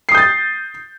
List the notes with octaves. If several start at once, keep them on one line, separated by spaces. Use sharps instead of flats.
D#6 G6 A6 C7